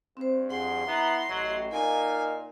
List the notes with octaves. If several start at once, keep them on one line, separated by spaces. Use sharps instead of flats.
G2 C4 C5
F2 G#4 F#5 C6
B3 E4 A#5
A1 F#3 D#5
A#2 D#4 A#4 F5 G#5